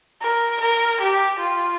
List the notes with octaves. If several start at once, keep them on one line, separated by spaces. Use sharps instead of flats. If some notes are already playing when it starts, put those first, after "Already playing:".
A#4
A#4
G4
F4